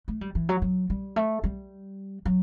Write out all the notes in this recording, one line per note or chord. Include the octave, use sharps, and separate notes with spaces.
A3
G3
E3
F#3
F#3
G3
A3
G3
F#3